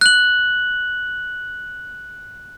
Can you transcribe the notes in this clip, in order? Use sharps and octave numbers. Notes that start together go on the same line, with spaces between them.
F#6 F#7